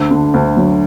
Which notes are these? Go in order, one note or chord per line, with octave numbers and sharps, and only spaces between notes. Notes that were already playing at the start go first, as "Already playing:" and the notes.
Already playing: D2
D3
D2
F#3